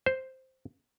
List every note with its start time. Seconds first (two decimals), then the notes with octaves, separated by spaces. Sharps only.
0.06 C5